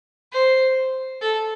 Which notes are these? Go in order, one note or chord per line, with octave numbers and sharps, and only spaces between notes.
C5
A4